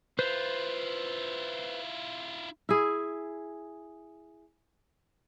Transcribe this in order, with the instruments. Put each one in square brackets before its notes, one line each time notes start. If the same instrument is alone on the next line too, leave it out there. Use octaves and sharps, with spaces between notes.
[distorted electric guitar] E4 F4 [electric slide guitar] B4 C5
[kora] E4 G#4